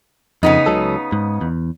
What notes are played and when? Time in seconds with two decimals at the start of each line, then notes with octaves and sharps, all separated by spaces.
0.43 F2 C#3 B3 D#4
0.66 C#2 F#3 A4
1.12 G#2
1.41 E2